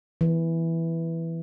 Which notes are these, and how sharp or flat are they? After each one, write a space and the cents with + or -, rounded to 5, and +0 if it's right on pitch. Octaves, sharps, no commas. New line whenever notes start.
E3 +0